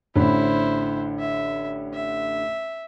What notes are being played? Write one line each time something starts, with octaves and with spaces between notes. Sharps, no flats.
A1 D3 E4 C5 B5
E5
E5